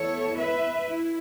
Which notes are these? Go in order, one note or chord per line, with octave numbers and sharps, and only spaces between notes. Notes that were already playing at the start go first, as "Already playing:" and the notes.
Already playing: E2 E3 B3 E4 A4 C#5
B4 E5
E4